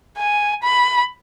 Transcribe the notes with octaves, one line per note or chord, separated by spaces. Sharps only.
G#5
B5